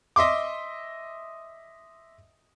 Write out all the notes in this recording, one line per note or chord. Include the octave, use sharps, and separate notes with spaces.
D#5 E5 C6 D6